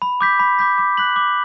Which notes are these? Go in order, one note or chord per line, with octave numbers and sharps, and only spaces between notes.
B5
D6 G6 B6
B5
D6 G6 B6
D6
F#6 B6 F#7
D6